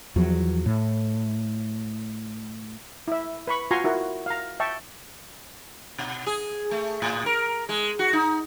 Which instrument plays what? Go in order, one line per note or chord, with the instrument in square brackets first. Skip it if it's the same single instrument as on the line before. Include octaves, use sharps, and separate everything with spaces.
[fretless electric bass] E2 F3 F#3
A2
[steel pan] E4 E5
B4 B5 C#6
F4 F#4 G#5 A#5 C6 C#6
E4 F#4 A#4
F5 A#5
E5 G5 A5 C#6
[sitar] B2
G#4
A3
A2
A#4
G#3
F#4
D#4